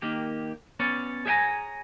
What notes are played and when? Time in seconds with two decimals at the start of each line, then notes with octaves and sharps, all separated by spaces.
0.02 D#3 A#3 G4
0.80 B3 C#4 C#5 D5
1.25 G#4 C#5 E5 G5 G#5 A#5